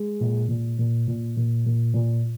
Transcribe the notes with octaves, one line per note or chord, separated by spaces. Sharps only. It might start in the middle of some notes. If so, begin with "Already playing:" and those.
Already playing: G#3
A#2
A#2
A#2
A#2
A#2
A#2
A#2